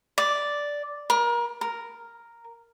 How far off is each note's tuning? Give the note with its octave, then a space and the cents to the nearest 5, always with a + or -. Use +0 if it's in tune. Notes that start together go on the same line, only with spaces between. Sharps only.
D5 -5
A#4 +30
A#4 +0